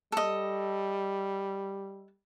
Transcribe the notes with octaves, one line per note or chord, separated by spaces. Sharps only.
G3 A4 D#5